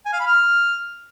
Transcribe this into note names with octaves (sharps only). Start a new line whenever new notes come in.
G#5
F5
B5
F6